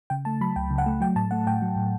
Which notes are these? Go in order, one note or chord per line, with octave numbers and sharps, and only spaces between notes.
C#3 G5
A3 A5
F#3 B5
C#2 G5
C#3
F#5
A3
F#3 G5
A2 A5
A3 F#5
A2 G5
F#3
A2